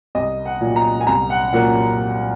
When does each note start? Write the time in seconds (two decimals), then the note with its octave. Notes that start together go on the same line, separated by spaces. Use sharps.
0.15 C2 D#5
0.46 F#5
0.61 A#2 F#3
0.76 A#5
1.01 G#5
1.07 C2 A#5
1.30 F#5
1.53 A#2 F#3 A#3 F#5